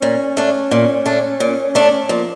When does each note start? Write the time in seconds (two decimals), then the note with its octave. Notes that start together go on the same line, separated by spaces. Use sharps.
0.02 A#2 C#4
0.37 A3 D4
0.71 A#2
1.06 A3 D4
1.40 A#2
1.75 A3 D4
2.09 A#2 F3